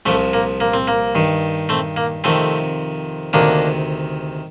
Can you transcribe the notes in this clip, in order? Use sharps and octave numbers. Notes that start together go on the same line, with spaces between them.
C2 C3 F3 A3
A#3
A#3
C4
A#3
G2 D#3
A3 C4
A#3
F2 C3 D#3 A3 C4
D2 C3 D#3 A#3 D4